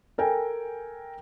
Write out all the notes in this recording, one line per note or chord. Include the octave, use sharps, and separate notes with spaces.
A4 A#4 G5 G#5